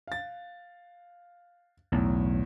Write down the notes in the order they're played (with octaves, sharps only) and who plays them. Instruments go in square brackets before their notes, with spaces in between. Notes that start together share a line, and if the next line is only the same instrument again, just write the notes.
[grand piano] F5 A6
[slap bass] B1 [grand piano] E2 A2